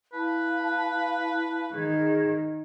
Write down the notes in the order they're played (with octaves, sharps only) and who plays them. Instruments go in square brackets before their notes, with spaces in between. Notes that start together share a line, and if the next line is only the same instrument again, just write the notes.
[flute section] E4 F5 A5 [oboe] B4
[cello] D#3 [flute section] G#4 G#6